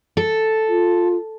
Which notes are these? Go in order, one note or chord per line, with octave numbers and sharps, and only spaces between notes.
A4
F4